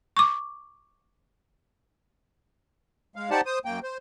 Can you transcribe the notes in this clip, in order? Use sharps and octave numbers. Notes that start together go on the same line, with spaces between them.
C#6 D6
G#3 F5
D#4 G4 C5 D5 F#5 A5
C5 D#6
F#2 A#3 G5
C5